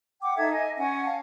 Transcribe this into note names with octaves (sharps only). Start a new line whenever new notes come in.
F#5 G5 D6
D#4 A4 E5 G#6
D#5 G#5
C#4 F#5 G#5
F5 A5